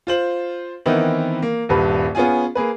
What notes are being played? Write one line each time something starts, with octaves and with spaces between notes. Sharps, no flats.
F4 C5 F#7
D#3 E3 B3 C4 D#4 E4
A#3
D#1 G2 B4
B3 C#4 F4 G#4 G#5
A#3 G#4 B4